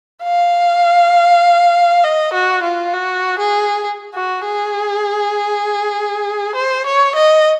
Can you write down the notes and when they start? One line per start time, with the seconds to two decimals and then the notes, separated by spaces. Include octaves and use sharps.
0.24 F5
2.04 D#5
2.33 F#4
2.63 F4
2.94 F#4
3.39 G#4
4.15 F#4
4.45 G#4
6.55 C5
6.86 C#5
7.16 D#5